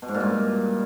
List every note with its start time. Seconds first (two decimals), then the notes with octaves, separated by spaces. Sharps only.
0.02 B2
0.08 G#2
0.14 A#2
0.20 G2